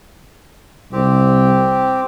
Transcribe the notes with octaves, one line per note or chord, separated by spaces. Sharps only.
C2 C4 G4